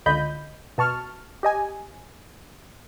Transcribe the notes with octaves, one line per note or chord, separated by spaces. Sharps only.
C#2 D3 F4 D#5 B5 G6
B2 A5 C#6 F6
G4 D#5 G#5